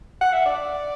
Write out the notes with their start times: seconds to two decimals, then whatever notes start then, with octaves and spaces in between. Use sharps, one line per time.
0.21 F#5
0.33 E5
0.46 D5